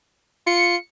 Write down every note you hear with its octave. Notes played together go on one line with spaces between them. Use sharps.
F4 C#7